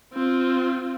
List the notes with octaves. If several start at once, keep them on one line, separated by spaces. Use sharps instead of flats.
C4 F4